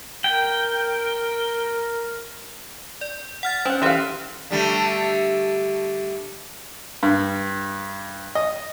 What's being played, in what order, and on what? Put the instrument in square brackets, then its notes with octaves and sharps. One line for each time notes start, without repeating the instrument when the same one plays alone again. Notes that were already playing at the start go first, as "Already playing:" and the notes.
[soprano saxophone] A#4 [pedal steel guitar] G5
[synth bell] D5
F#5 F6 A6
[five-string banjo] C4 F#5 [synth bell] C#4
[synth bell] E3 G4 [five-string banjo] E4 B4 F5
[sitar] D3 G3 A3
[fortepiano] G2
D#5